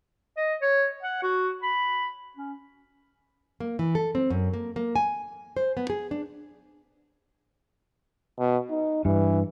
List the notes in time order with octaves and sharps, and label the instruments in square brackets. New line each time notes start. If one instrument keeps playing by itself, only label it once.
[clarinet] D#5
C#5
F#5
F#4
B5
C#4
[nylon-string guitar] A#3
E3
A4
C4
F#2
A#3
A#3
G#5
C5
B3
G#4
D4
[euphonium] B2
D#4
[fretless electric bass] G2 [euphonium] E3